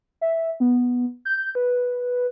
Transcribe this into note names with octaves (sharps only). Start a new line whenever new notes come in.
E5
B3
G6
B4